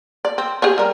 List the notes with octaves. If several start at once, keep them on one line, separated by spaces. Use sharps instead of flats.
D5
C4
G4 G#4 C#5
G3 A#4